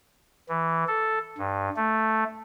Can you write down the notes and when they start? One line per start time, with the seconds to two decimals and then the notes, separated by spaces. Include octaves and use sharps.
0.49 E3
0.88 A4
1.38 G2
1.76 A3